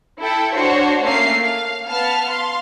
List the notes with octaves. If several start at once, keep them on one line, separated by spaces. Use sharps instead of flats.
E4 A4 G5
D4 F#4 C5 C#5
A3 A#3 C#4 F5 C7
F5
B3 F5 A5 F6
F5 C6